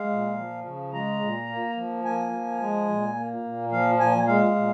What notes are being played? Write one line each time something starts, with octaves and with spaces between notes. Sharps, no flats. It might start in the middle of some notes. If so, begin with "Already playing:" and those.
Already playing: G#3 F5
A#2
F3
C#3
G#3 A#5
A#2
A#3
F3
A#3 G#5
F3
G#3
A#2
A#3
A#2
F3 F5
A#2 G#5
G#3 F5
A#2